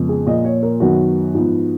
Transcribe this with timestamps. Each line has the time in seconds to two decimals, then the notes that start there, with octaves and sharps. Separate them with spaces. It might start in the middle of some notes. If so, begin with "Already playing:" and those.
Already playing: F2 C#3 G#3 B3
0.09 G#4
0.26 A#2 F3 A#3 D#5
0.45 C#5
0.63 A#4
0.80 F#2 D#3 F#3 B3 F#4
1.34 G#2 F3 B3